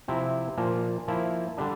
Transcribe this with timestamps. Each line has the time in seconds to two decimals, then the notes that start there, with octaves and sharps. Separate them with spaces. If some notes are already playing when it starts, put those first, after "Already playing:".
0.08 C3 F3 C4 E4
0.58 A#2 F3 A#3
1.08 F3 A#3 E4
1.58 D3 G3 D4